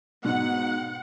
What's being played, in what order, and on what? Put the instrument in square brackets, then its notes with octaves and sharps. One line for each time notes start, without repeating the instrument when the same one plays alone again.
[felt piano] G#2 B2 [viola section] F#5